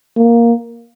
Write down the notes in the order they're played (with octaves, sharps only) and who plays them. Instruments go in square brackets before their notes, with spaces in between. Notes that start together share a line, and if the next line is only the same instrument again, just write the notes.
[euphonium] A#3